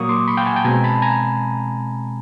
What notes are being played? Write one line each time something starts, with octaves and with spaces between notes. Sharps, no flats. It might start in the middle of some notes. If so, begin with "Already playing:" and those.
Already playing: A#2 F#3 A#3 C#6 D#6
C6 D6
B5 C#6
F5 G5
F#5 G#5
G5 A5
B2 G#3 C4 G#5 A#5
A5 B5
G#5 A#5